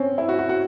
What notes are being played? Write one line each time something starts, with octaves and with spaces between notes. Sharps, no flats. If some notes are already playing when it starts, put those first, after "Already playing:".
Already playing: C4 C#4
E4
F#4
F#4
F#4